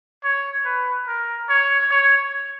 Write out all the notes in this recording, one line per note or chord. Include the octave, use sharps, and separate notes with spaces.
C#5
B4
A#4
C#5
C#5